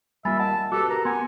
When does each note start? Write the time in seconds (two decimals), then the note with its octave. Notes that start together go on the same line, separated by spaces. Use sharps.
0.25 G3 A#3 F4 E5 G#5 B5 A6
0.39 D#5 F#5 A5
0.72 F#4 G4 A4 B4 D6
0.90 A#4 A#5
1.05 B3 F#5 G#5 C6